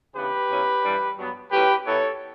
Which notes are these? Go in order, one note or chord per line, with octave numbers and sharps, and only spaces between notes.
C#3 E3 B3 D4 G4 B4
B2 F#3 C#4 E4
G2 E3 G3 D4
G2 F#3 B3
A2 F#3 C#4 E4 G4 B4
B2 F#3 B3 E4 A4 C#5